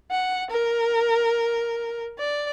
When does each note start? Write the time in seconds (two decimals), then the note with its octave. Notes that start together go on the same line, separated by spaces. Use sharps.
0.11 F#5
0.50 A#4
2.18 D5